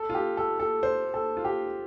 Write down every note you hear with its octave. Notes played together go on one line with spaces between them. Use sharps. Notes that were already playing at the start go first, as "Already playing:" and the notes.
Already playing: A4
F4
G4
A4
A4
C5
A4
F4
G4